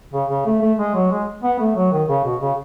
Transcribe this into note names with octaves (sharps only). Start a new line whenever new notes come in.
C#3
C#3
A3
A3
G#3
F#3
G#3
B3
A3
F#3
D#3
C#3
B2
C#3